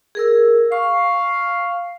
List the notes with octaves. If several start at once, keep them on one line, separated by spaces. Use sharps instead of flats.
G#4 A#4 E6
F5 C#6